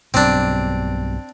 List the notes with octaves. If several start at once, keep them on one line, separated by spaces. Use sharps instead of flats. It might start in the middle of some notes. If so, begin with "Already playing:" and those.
B1 G2 C4 D4